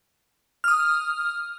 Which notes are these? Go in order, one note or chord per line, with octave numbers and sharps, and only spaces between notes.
D#6 F6